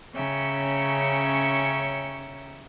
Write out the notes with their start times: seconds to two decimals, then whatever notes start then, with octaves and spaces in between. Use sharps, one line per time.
0.14 C#3 C#4 C#5 E5 G5 A#5